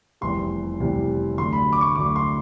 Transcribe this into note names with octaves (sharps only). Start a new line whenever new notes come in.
F1 E2 C3 E3 G3 C6
F1 E2 C3 E3 G3
D2 D3 F#3 C6
B5
D6
C#6
D2 D3 F#3 D6
C6